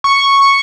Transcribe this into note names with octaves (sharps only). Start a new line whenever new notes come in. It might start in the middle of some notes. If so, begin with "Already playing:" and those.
C#6